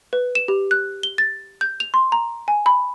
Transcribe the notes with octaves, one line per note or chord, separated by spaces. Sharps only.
B4
E7
G4
F#6
G7
A6
G6
F7
C6
A#5
G#5
B5